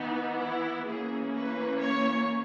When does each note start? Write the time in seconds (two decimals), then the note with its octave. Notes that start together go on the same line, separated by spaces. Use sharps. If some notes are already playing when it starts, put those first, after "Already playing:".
Already playing: E3 B3 D#4
0.40 E4
0.86 E3 A#3 C#4 G#4
1.33 B4
1.80 C#5